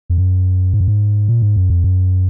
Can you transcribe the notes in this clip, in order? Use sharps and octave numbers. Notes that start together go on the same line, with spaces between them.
F2
F#2
G#2
F#2
G#2
A#2
G#2
F#2
F2
F#2